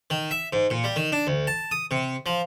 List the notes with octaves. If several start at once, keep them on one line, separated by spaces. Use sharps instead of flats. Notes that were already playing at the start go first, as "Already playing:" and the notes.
D#3
E5
G#2
A#2
G3
D#3
D4
D2
A5
D#6
C3
F3